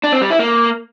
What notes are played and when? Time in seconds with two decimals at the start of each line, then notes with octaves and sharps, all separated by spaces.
0.04 D4
0.13 C4
0.21 G3
0.30 E4
0.39 A#3